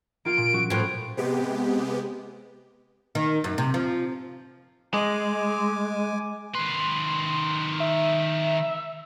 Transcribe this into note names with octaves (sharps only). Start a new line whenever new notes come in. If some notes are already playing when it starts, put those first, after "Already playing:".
A#3 F4 F5 D7
A#2
F#3 C#4 F#4
A2 F3 G5 F#6
C3 G#3 B3 G4
D#3
F#2
C3
F3
G#3 G#5 D6
D#3 B4 C6
E5